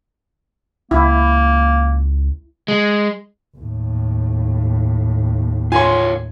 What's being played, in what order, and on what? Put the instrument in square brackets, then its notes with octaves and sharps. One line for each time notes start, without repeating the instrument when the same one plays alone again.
[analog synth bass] C#2 [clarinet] A#3 [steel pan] E4
[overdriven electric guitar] G#3
[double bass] D#2 A2
[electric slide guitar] F4 A#4 C#5 [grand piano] G#5 C6